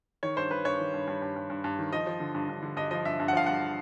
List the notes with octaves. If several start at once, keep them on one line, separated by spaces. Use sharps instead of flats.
D#3 C#5
G2 C5
G2 B4
G2 C#5
D#3
G2
G2
G2
G2
G2
G2
D#3
F3 D#5
F3
D3
G2
G2
D3
G2 D#5
F3 D#5
G2 E5
G2
F#5
F3 F5
G2 F#5